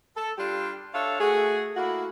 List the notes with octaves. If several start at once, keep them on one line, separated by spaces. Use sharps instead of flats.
A4
G3 D4 F4 G4
D4 A4 C#5 E5 F5
A3 F#4 G#4
A3 A#3 E4 F#4